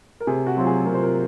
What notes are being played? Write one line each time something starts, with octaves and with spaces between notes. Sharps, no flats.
A#4
C3 G#4
F#4
F#3 C4 F4
G#4
C3 A#4
C5
A#4